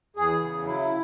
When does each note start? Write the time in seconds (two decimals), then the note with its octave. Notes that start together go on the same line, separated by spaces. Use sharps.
0.16 E2 G#4
0.40 C#3
0.65 F#3 E4